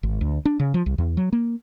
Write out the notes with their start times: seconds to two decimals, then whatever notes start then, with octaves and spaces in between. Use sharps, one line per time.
0.03 G#1
0.21 D2
0.45 D4
0.60 C#3
0.74 F3
0.86 C2
0.98 E2
1.17 F#3
1.33 A#3